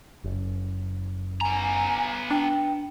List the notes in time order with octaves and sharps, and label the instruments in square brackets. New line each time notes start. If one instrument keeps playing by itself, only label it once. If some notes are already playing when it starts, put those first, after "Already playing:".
[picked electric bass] F#1
[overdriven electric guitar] B3 A#5 [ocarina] G#5
[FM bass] D4 [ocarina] G5